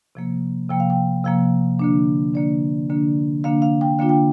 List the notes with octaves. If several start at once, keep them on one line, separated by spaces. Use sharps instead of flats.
C3 F3 A#3
C3 F3 A#3 G5
F5
G5
C3 F3 A#3 F5
D3 A#3 D4
D3 A#3 D4 D5
D3 A#3 D4
D3 A#3 D4 F5
F5
G5
D3 A#3 D4 F4 F5
G5